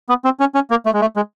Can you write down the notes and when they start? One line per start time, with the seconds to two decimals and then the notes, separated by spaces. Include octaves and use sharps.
0.09 B3
0.24 C4
0.40 C#4
0.55 C#4
0.70 A#3
0.86 A3
0.93 G#3
1.01 A3
1.16 G#3